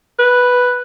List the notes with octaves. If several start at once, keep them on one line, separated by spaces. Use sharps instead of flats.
B4